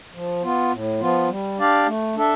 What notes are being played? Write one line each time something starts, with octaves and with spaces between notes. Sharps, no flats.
F3
B3 F4
A2
F3 B3 F4
G3
D4 G4 D5 F5
A3
D4 A4 E5